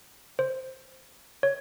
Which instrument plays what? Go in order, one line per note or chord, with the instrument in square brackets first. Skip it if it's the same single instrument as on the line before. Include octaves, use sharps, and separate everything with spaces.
[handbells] C5
C#5